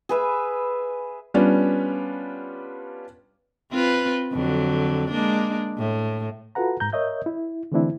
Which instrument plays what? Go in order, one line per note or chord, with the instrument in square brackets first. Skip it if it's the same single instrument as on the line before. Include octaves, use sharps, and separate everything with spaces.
[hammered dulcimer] G#4 B4 E5
[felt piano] G3 B3 C#4 D4 F4
[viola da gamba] C4 F4 B4
F2 D3 F#3
G#3 A#3 D4
A2
[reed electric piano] F4 F#4 A4 B4 F#5 A#5
G#2 A#5 G6
A#4 C#5 D#5 E5 G6
E4
D3 E3 A3 C4 D4 E4